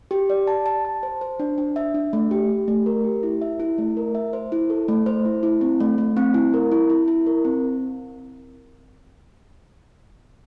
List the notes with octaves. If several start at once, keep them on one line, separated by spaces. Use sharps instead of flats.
G4
D5
A5
A5
A5
C5
C5
D4
D4
E5
D4
A3
G4
G4
A3
A#4
G4
E4
E5
E4
A3
A#4
E5
C5
E4
A4
A3
C5
E4
E4
C4
A3
A3
C4
E4
A#4
E4
E4
E4
A#4
C4